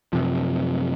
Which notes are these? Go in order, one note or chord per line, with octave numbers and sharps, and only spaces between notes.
F#2 C3 F3